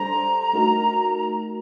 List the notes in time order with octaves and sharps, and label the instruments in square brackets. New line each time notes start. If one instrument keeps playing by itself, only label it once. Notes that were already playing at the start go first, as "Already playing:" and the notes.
Already playing: [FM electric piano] G3 D4 A4 C5 [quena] A#5
[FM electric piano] A3 D#4 F#4 A#4